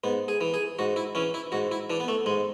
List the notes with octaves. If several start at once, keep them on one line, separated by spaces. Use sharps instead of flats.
G#2 B3
G#4
E3
G#4
G#2 F#4
E4
E3 C#4
E4
G#2 F#4
E4
E3 D4
B3
A3
G#2 G#3